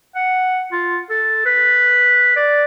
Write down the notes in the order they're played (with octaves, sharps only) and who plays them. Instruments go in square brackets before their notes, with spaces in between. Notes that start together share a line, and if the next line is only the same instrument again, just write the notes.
[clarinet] F#5
F4
A4
B4
D5